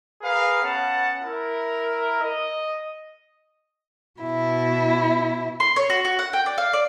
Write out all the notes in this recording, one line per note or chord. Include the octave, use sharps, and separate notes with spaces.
G#4 A#4 B4 F5
B3 C#4 F#5 A5
E4 A#4
D#5
B2 E4
C6
C#5
F#4
F#4
F#5
G5
D5
F5
D5